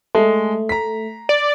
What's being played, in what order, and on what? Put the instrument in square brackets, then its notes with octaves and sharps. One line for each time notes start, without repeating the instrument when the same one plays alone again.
[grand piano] G#3 [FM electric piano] A3
[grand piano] A#5 B6
[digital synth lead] D5